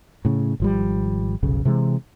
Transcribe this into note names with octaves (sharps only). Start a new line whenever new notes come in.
A2 C#3
G#1 F3 G3
F1 B1 C#3
C3 E3 G#3